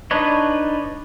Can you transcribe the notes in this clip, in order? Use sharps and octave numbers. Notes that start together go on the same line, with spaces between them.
D4 D#4 B4 C#5 D#5